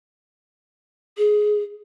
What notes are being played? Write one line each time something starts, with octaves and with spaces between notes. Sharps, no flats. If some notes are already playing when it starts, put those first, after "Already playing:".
G#4